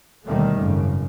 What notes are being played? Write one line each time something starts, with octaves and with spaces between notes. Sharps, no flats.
D#2 B2 D3 D#3 G3 A3
G#1 F#2 C#3